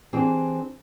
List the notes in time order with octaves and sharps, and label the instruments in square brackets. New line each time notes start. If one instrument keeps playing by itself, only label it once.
[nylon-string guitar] E3 C4 D4 G4 G#4 C5